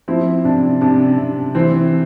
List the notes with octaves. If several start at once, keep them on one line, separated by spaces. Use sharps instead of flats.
F3 C4 E4
C3 D4
C3 D4
C3
E3 C4